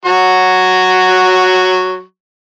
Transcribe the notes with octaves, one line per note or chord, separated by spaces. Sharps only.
F#3 F#4 C#6